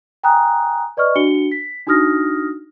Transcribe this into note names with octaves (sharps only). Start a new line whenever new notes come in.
G5 G#5 A#5 D#6 F#6
B4 D5 D#5 C#6 F6
D4 F#4 C#7 G7
B6
D4 D#4 F#4 D#6 F6 A#6